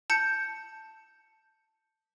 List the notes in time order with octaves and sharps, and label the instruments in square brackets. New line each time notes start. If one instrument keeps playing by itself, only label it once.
[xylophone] A5 G6 C#7